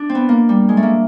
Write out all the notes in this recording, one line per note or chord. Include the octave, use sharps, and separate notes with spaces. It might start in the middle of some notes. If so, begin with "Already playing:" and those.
Already playing: D4
C4
B3
A#3
G3
G#3
A3
A#3